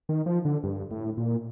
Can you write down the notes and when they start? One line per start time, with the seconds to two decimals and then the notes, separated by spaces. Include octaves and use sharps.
0.09 D#3
0.26 F3
0.45 D3
0.63 G2
0.91 A2
1.17 A#2